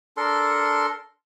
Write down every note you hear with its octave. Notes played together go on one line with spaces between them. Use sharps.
D4 A4 A#4 C6